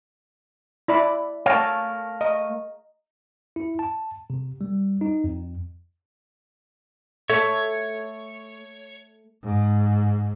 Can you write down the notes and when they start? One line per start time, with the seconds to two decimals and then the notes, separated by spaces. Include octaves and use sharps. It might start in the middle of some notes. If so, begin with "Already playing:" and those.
0.88 E4 D5 B5
1.46 A3 A#4 C#5 F5 A5
2.21 D#5
3.56 E4
3.79 A5
4.30 C3
4.61 G3
5.01 D#4
5.24 F2
7.30 A3 C#5
9.44 G#2